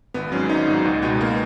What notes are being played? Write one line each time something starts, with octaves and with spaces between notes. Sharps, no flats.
G#1 B3
G#2 F#3 C#4
G#1 D#4
G#2 F#3
C#2 D#4
B2 G#3 B3
A#3